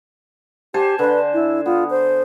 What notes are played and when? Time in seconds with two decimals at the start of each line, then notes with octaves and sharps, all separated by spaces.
0.74 G4 C5 G#5 A5
0.99 D3 B4 C6
1.34 E4
1.66 B3 F4
1.90 C5